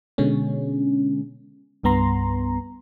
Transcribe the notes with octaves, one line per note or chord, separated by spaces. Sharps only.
B2 D3 G#3 C#4
C2 G2 B3 A#5 C6